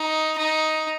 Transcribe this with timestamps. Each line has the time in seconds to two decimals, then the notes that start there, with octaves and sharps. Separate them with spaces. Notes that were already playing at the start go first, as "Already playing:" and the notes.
Already playing: D#4
0.37 D#4